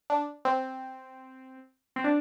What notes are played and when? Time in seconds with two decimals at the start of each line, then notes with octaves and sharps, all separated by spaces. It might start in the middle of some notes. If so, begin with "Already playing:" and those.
0.10 D4
0.45 C4
1.96 C4
2.04 D4